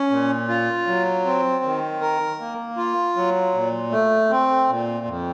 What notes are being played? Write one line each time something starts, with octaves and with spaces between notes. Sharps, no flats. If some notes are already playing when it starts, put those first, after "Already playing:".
Already playing: C#4
A#2
F4
F#3
C4
D#3
A#4
A#3
F4
F#3
A#2
A3
C4
A#2
F2